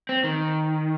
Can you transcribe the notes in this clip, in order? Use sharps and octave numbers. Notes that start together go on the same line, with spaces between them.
C4
D#3